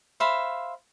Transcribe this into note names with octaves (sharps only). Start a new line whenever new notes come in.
C5 E5 F5 B5